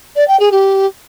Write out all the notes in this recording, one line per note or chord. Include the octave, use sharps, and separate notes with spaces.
D5
G5
G#4
G4